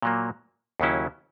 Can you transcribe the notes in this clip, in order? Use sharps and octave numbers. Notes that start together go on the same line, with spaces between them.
A#2 F#3 A#3
D#2 C#3 F#3 C#4 E4